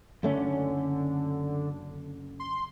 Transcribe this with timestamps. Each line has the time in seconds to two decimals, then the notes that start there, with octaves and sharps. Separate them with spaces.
0.23 F#1 D3 A3 C#4
2.40 C6